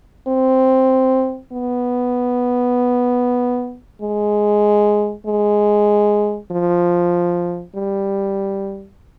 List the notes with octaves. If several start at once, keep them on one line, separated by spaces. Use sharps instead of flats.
C4
B3
G#3
G#3
F3
G3